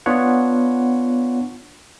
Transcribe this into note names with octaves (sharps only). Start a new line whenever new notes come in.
B3 D4 F4 C#5 F#5